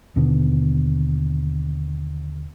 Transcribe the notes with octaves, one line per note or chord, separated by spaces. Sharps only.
D#2 B2 D3 B3